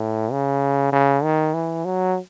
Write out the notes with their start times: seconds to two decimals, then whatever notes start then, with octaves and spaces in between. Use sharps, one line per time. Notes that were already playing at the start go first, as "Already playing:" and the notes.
Already playing: A2
0.32 C#3
0.93 C#3
1.24 D#3
1.54 E3
1.85 F#3